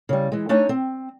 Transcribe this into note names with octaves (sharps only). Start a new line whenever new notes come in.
C#3 G3
E3 G#3
A3 D4 D#4 C#5 G#5
C4